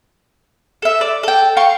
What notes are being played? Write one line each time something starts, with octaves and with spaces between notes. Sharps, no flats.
A4 E5
D5
A4 G5
F5 G5 C#6